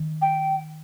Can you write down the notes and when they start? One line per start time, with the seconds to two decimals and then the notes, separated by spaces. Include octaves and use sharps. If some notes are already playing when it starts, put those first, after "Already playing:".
Already playing: D#3
0.22 G5